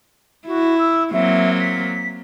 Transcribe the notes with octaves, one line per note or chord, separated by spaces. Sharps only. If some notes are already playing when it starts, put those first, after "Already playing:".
E4 F#4
E6
F#3 A#3 C4 E5
B6